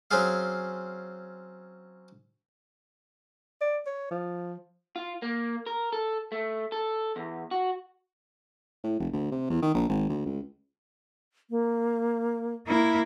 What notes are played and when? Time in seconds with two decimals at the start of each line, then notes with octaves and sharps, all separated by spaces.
0.11 F#3 C4 C#4 F4 G#4 F5
3.61 D5
3.87 C#5
4.11 F3
4.96 F4
5.22 A#3
5.66 A#4
5.93 A4
6.32 A3
6.72 A4
7.16 E2
7.51 F#4
8.84 A2
9.00 F1
9.13 D2
9.32 C3
9.50 E2
9.62 D#3
9.74 A#1
9.89 G#1
10.09 D2
10.25 C#2
11.50 A#3
12.67 A#3 E4